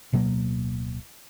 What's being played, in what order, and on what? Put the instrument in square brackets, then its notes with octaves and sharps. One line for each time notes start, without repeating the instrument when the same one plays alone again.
[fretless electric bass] D1 B2 F#3 A#3